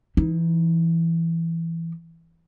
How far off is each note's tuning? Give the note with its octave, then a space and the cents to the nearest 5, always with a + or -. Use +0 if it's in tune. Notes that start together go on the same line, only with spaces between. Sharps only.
E3 +10 D#4 +30